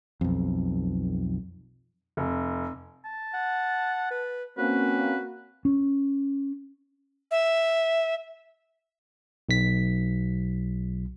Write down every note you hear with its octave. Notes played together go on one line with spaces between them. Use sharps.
B1 F2
F1
A5
F#5
B4
A#3 C4 C#4 F#4 B4
C#4
E5
B1 B6